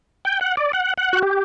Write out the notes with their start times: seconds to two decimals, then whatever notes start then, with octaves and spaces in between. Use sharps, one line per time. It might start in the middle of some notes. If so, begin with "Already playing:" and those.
0.25 G5
0.41 F#5
0.57 D5
0.73 F#5
0.98 F#5
1.13 F#4
1.23 G4